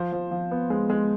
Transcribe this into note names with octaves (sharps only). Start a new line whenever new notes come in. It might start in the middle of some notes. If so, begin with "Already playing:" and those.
Already playing: F3 C5
F3
F3
B3
G#3
G#3